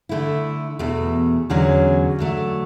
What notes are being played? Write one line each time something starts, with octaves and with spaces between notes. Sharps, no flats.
D3 A3 E4
E2 B2 A3
E2 D3 F#3 C#4
D3 F#3 A3